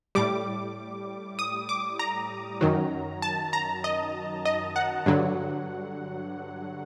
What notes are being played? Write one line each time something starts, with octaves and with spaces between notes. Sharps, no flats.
A2 G3 D6
D#6
D6
A#5
F#2 D#3 F#3
A5
A#5
D#5
D#5
F#5
G2 D3 F#3